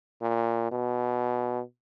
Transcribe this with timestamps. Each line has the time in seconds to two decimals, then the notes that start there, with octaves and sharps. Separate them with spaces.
0.22 A#2
0.71 B2